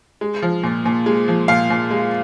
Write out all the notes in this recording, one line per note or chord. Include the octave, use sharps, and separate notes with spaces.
G#3
F3
A#2
A#2
G#3
F3
A#2 F5
A#2
G#3